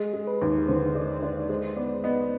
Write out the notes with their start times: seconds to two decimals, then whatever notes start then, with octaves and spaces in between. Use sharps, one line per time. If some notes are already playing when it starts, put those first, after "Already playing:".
Already playing: G#3 G#4
0.13 G#3
0.27 B4
0.42 D#2
0.68 D3 C5
0.95 G#3 D5
1.23 D4 C5
1.49 G#3 C5
1.76 B3 D5
2.04 B3 D#5